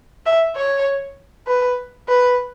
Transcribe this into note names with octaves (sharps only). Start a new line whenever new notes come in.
E5
C#5
B4
B4